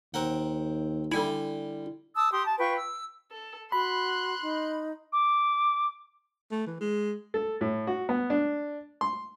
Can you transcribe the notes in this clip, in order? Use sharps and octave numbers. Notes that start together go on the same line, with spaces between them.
D#2 C4 A#4 F#5
D3 G3 E4 G#5
A5 D#6 E6
G4 C6 D#6
A5
F4 B4 G5 C#6
E6
A4
F#4 B5 C6 F#6
D#4
D6
A3
E3
G#3
A4
A2
F#4
B3
D4
C6